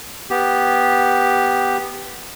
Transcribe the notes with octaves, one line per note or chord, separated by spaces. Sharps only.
B3 G4